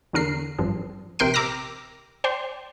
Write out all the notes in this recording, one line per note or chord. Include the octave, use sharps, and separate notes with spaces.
E2 D3 A#4 C7
A1 G2 F3
A#1 C3 A#4 G5 C6 D7
A#5 D6 E6 F6 A#6
C5 D5 G5 C6